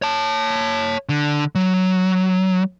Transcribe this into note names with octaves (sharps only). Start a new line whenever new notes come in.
C#5 A5
D3
F#3